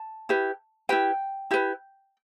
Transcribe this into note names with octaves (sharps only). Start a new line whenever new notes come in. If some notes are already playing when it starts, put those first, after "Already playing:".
Already playing: A5
E4 G4 B4
E4 G4 B4 G5
E4 G4 B4